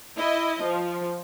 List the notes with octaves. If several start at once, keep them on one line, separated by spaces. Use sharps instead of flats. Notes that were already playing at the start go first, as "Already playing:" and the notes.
E4 D#5
F3